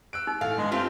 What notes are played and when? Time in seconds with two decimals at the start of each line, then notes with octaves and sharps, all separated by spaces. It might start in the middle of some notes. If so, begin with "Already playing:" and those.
0.13 E6 F#6 D7
0.27 D#4
0.41 A2 A3 F5
0.58 G2 G#3
0.71 A3 C4 F4 G4